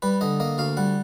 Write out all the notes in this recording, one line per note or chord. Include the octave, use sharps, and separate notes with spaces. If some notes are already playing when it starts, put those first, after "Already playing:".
G3 B4
D3 D#5
A#3 D#5
D2 F5
G3 F#5